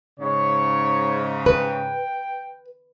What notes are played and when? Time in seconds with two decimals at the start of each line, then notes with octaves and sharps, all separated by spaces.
0.20 G#2 C#3 C#5
1.46 B4 G5